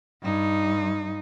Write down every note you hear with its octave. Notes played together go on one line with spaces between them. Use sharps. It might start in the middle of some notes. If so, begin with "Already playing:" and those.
G2 D#4